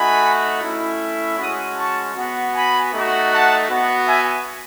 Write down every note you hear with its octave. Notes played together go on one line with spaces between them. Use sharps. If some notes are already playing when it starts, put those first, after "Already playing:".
Already playing: A3 D#4 F#4 G#5 B5
A3 C#4 E4
G#3 C#4 F#4 B5 D#6
A5 C#6
B3 F#4
G#5 B5
A3 D#4 F#4
F#5 A5
B3 F#4
E5 G#5